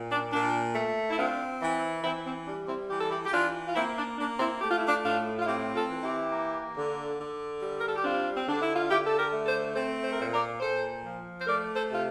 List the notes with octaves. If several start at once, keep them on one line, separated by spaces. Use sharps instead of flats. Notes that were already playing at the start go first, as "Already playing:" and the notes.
Already playing: A#2
D4
A#2 D4
A3
E4
C4 D4 F4
E3
E3 C4 E4
C4
G3 D4
C4 E4
E3 G4
A4
E4 G4
G4
E3 D4 F4
F4
A#3 C4 E4
D4
A#3 D4
C4 E4
A3 G4
F4
E4
D4 F4
A2 D4 F4
F4
C4 E4 G4
F4 A4
E3
E4 G4
A#3
D3
D3
G3
A#4
A4
G4
C4 D4 F4
C4
D3 D4
E4
F4
D3 E4 G4
A4
G4 A#4
A3
A4 C5
C4 A4 C5
C5
A#4
A#2 A4 C5
A#4 D5
A#2 A4 C5
F3
C5
A3 A#4 D5
A4 C5
C3 F4